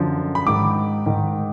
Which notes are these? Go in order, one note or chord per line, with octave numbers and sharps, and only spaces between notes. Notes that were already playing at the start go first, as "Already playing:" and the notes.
Already playing: F#2 D3 F3
B5
G#2 D#3 D6
G#2 D#3